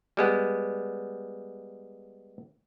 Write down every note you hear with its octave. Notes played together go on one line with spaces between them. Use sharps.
G3 G#3 B3